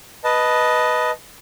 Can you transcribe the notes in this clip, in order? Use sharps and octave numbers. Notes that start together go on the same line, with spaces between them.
B4 D#5 A5